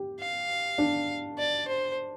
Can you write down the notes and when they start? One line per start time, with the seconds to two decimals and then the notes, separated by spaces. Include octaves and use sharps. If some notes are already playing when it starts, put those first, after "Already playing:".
Already playing: G4
0.20 F5
0.78 D4
1.38 D5
1.68 C5